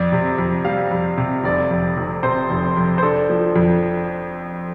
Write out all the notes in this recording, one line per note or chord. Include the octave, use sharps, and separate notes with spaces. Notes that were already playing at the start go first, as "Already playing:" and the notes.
Already playing: F2 D5
C3
F2
G3 F5
F2
C3
F1 D5
F2
F1
C3 C5
F1
F2
C5
D4 A4
F3
F2